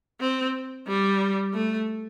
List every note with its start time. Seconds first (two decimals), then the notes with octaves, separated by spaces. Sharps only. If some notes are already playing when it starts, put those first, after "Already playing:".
0.21 C4
0.88 G3
1.53 A3